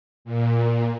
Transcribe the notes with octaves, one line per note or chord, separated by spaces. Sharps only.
A#2